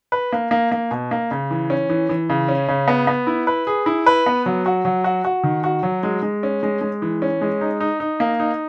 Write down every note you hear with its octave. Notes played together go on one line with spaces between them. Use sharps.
B4
A#3
A#3
A#3
B2
A#3
C#3
E3
C#4
E3
E3
C#3
C#4
C#3
B3
B3
E4
B4
G#4
E4
B4
B3
F#3
F#4
F#3
F#4
F#4
D#3
F#4
F#3
G#3
G#3
C#4
G#3
G#3
E3
C#4
G#3
D#4
D#4
D#4
A#3
D#4